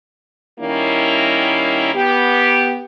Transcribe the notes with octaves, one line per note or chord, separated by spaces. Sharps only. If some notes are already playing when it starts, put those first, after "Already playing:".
D#3 G3 A#3 C#4 E4
B3 G4